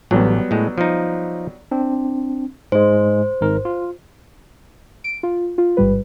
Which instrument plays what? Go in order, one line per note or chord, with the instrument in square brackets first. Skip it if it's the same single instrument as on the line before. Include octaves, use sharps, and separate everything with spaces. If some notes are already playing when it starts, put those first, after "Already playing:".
[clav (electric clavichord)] A1 [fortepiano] F#3 G3 B3
[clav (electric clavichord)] A2 G#3
F3 D#4
[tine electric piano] C4 D4
[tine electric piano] G#2 G#3 [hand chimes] C5
[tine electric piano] G#1 G#2 A#4
F4
[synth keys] D7
F4
F4
A1 G#2 G3 B4